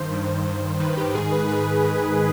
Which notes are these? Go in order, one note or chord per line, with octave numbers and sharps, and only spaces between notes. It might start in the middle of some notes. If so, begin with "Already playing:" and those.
Already playing: G2 D#3 C5
G2 D#3
G2 D#3
G2 D#3 B4
G4
G#2 D#3 G#4
B4
G#2 D#3 B4
G#2 D#3